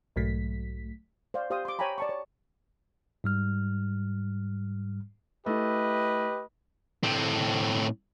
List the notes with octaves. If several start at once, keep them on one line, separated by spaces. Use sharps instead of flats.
B1 G#2 F#3 A3 B6
C5 D5 F5
G4 C5 F5 D#6
C6 D6
C#5 G5 G#5 A#5 B5
D5 A5 C#6
C#5
G#2 G3 F6
A3 E4 G4 B4 D#5
A2 C4